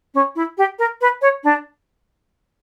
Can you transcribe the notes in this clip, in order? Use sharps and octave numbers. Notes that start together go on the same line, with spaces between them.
C#4
E4
G4
A#4
B4
C#5
D4